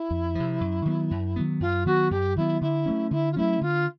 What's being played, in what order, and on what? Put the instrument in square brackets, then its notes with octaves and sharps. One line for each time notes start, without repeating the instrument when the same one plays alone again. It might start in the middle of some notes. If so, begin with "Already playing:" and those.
Already playing: [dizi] E4
[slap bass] F2
C3 F3
F#2
D#3 F#3 B3
F#2
D#3 F#3 B3
[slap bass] F#2 [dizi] F4
[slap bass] D#3 F#3 B3 [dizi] F#4
[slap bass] F#2 [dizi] G4
[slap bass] D#3 F#3 B3 [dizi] E4
[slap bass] D3 [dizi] E4
[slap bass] F#3 A3 C#4
[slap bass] D3 [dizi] E4
[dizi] F4
[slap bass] F#3 A3 C#4 [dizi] E4
[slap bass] D3 [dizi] F4